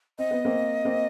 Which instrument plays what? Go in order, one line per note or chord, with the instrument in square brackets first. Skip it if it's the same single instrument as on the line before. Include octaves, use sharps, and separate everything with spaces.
[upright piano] C4 [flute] D#5
[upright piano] B3
A#3 C4
A#3 C4